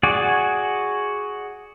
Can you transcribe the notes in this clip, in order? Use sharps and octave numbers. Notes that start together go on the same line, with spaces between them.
F#4 G#4 D5